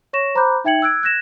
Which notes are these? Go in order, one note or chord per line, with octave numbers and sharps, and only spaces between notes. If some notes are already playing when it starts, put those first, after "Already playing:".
C#5 C#6 A#6 E7
C5 A#5 B5 D6 F#6 G6
D#4 E5 G5 G#6 C#7 F#7
E6 F#6 G#6 D7
F#6 G#6 A#6 E7